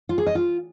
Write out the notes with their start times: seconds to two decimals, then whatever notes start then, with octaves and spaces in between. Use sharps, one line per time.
0.09 F4
0.18 G#4
0.27 D#5
0.35 F4